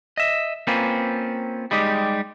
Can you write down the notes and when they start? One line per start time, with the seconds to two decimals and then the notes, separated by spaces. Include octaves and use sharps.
0.17 D#5 E5
0.67 A#3 C4 C#4 F4 B4
1.71 G3 G#3 D#4 G4